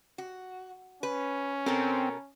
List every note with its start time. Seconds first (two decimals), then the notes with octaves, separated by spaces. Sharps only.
0.18 F#4
1.03 C#4 B4
1.66 B2 C4 A4 A#4